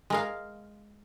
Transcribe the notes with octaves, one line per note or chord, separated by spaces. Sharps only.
G#3 A#4 F5